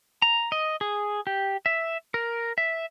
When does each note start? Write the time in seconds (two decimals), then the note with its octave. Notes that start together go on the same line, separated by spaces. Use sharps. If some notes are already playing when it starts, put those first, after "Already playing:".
0.22 A#5
0.52 D#5
0.81 G#4
1.27 G4
1.66 E5
2.14 A#4
2.58 E5